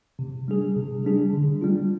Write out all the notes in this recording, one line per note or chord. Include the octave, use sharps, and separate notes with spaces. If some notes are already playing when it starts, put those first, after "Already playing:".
C3
G3 D4 G#4
C3
G3 D4 G#4
D3
G3 D4 F4